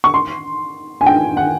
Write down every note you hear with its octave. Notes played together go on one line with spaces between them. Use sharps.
C#6
C6
G#5
G5
F#5